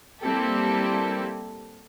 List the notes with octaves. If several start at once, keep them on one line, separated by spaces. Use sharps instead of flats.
G3 A#3 C4 E4 G4 A4